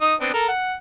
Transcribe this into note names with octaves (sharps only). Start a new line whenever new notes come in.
D#4 D#6
B3 C4 D4
A4 A#4 A#5
F#5